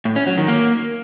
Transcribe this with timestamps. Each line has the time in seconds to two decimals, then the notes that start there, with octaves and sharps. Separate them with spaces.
0.05 A2
0.16 C#4
0.27 F#3
0.38 D#3
0.48 A#3